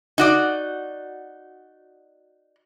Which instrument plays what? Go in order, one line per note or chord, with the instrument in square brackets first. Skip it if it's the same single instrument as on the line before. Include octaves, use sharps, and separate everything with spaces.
[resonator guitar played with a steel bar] D#4 F#4 D5